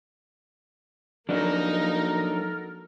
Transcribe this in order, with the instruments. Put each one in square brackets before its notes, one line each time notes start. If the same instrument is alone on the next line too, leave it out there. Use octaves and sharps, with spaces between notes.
[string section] F3 A#3 D#4 [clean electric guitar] F#3 D4 [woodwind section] A4 A#4